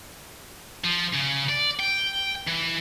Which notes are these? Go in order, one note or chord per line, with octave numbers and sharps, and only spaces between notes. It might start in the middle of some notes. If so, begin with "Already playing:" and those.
F3
C#3
D5
G5
E3